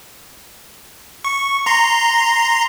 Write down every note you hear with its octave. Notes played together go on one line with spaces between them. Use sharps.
C#6
A#5 C6